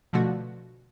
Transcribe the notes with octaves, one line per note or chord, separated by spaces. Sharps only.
B2 D3 F3 A3 F#4